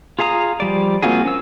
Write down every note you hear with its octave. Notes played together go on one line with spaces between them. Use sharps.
F4 G#4 F5 A#5 D#6
F3 G3 D5
A#3 C4 F4 F#4 G#4
C#4 E6